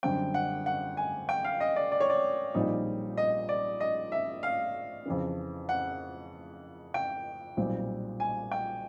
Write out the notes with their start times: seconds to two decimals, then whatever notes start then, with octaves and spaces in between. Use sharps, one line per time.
0.03 F#2 D3 G3 C4 G5
0.34 F#5
0.66 F#5
0.97 G#5
1.29 G5
1.45 F5
1.60 D#5
1.76 D5
1.92 D5
2.00 C#5
2.10 D5
2.54 A#1 A#2 G3 C4 D#4
3.17 D#5
3.49 D5
3.80 D#5
4.12 E5
4.43 F5
5.06 F2 C#3 E3
5.69 F#5
6.94 G5
7.57 B1 A#2 G3 C4
8.20 G#5
8.51 G5